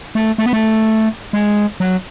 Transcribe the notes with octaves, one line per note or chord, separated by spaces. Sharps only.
A3
A3
B3
A3
G#3
F#3